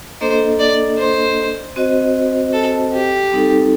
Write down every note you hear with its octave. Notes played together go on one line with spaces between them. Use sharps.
A#3 D4 A4 C5 D#5
D5
C5
C4 F#4 C5 D#5
A4
G4
G3 C4 D#4 A4